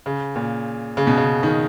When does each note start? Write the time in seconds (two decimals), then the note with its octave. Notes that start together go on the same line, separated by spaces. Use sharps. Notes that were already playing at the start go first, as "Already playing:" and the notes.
0.06 C#3
0.36 A#2
0.97 C#3
1.07 B2
1.17 C#3
1.43 D#3